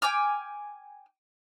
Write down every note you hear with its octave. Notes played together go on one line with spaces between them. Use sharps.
G5 G#5 D6 F6